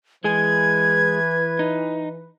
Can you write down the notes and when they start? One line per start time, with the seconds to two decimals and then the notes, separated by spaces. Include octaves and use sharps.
0.24 E3 G#3 G#4 B4 G#6
1.59 D#4